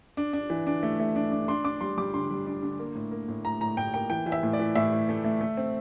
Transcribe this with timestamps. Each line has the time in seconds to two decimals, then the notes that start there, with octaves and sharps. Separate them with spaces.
0.17 D4
0.33 D4
0.50 E3
0.67 D4
0.83 A3
1.00 A3
1.16 D4
1.32 D4
1.48 D4 C6
1.65 D4 D6
1.81 G3 C6
1.98 G3 D6
2.14 D3 C6
2.30 G3
2.47 D4
2.63 D3
2.79 A#3
2.95 A2
3.12 A#3
3.28 A2
3.44 A2 A#5
3.61 A2 A#5
3.77 A2 G5
3.94 A#3 G5
4.10 E3 G5
4.26 E3
4.32 E5
4.43 A2
4.53 D5
4.59 E3
4.75 A2 E5
4.92 A2
5.09 A3
5.24 A3
5.41 A3
5.57 C4